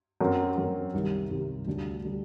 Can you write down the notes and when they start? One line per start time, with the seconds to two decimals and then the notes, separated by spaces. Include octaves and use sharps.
0.21 F#2 F#3 C4 F#4 A#4
0.57 F#2 F#3 C4 F#4 A#4
0.93 C2 C3 D#3 G3
1.30 C2 C3 D#3 G3
1.67 D2 D3 G3 D4
2.04 D3 G3 D4